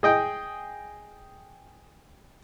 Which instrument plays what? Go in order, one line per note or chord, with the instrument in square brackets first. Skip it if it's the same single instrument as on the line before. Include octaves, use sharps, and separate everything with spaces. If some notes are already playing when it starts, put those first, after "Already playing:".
[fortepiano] G#4 D#5 G5